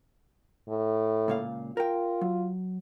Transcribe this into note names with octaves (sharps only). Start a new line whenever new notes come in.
A2
C#2 A#2 F5
F4 A#4 G5
F#3